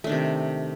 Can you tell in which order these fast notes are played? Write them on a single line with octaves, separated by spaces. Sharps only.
A3 D4 D#3 C3